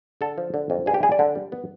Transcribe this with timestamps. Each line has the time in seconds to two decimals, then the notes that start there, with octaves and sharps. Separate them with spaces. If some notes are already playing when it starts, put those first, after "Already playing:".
0.21 D3 A4
0.38 F3
0.54 D3
0.70 F2
0.86 G2 G#4
0.94 G4
1.03 G3 G#4
1.12 D5
1.19 D3
1.35 G3
1.52 B3